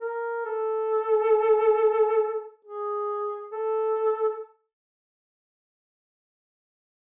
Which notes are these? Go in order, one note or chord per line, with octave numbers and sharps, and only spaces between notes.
A#4
A4
G#4
A4